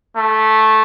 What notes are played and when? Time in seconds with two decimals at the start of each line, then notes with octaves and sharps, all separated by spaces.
0.17 A3